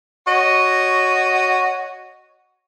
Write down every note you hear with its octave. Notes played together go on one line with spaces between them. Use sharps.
F#4 C#5 D#5